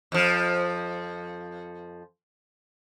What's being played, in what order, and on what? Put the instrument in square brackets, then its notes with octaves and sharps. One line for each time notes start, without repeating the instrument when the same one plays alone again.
[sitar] F2 F3